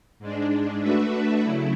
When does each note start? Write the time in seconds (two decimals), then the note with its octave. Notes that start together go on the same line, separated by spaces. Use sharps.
0.19 G#2 G#3 D4
0.81 A3 D4 F#4 B4 E5
1.42 C#3 F#3 A3 E4